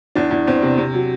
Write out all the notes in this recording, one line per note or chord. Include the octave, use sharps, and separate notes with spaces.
E2 D4
E2
E2 C4
C3
C3
F#3